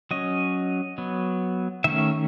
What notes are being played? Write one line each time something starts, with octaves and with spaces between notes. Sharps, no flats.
F#3 C#4 D#5
F#3 B3
D#3 A3 C#4 E5